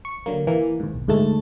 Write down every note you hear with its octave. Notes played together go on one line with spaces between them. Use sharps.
C#6
D3 F#3 A#3
E3 A#3
D#2 G#2
B1
D2 G#2 G#3 A3 A5 A6